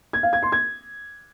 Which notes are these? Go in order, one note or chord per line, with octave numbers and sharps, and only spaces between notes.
G#6
F5
G#6
C6
G#6